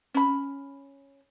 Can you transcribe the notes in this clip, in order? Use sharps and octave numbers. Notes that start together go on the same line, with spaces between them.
C#4 B5